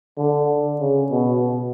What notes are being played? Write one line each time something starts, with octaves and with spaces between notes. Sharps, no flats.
D3
C#3
B2
B2